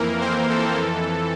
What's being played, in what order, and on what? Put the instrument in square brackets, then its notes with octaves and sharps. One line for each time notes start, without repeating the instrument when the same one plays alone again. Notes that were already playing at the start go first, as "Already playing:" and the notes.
Already playing: [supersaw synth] F2 E3 A#3 A#4
C4 C5
A4
F2 E3